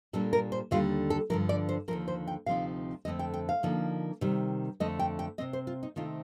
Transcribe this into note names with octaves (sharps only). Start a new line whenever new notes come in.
A#2 G3 A#3 D4 A4
A#4
C5
D#2 D3 G3 D4 F4
A4
G2 D3 F3 A#4
D5
C5
D#2 D3 F3 A#4
C5
G5
D2 C3 F3 C4 D#4 F5
F2 D3 A3 C4 D#5
G5
G5
F5
D3 F3 A#3 D#4
C3 D#3 G3
F2 D3 A3 D#5
G5
G5
C3 F3 C4 D#5
C5
F4
D#4
C3 D#3 A3 C4 D#4 F4